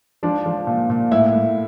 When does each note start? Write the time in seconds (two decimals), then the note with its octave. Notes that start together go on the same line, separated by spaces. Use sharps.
0.23 F3 D4
0.46 F3
0.67 A#2
0.90 A#2
1.11 A2 E4
1.33 A2